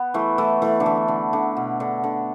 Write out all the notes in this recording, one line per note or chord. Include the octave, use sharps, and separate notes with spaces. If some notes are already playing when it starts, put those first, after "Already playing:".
Already playing: B3
E3 A3
E3 A3
E3 A3
D3
E3
D3
D3
B2
D3
D3